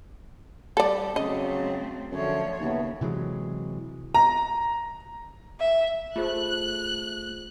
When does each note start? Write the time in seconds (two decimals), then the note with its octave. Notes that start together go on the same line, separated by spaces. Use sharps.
0.77 G3 A4 D5
1.16 C#3 F#3 A3 C4 D#5
2.11 F#2 D3 F3 A3 C#5
2.60 D#2 C#3 A3 B3
3.01 C3 E3 F#3 G#3
4.15 A#5
5.60 E5
6.16 A3 F4 G#4 C5 F#6